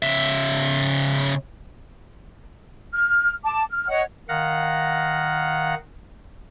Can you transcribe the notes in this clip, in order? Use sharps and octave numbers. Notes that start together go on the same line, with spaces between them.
C#3 E5
F6
A5 D6
F6
C#5 D#5 F#5
D#3 F5 F#5 A#6